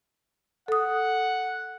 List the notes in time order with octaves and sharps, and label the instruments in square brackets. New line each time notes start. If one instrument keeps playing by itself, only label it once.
[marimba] A4 D#6 [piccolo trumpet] F#5